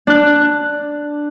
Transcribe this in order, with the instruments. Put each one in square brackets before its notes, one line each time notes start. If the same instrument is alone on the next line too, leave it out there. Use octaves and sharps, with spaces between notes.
[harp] D4 F#6